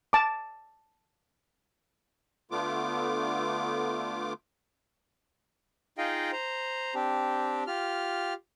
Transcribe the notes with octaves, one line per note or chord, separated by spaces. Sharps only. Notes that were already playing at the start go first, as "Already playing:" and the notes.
A5 D6
D3 A3 B3 F4 D6
D#4 F4 G#4 D#5 F5 G5
C5 A#5
C4 D4 G4
F4 G4 F6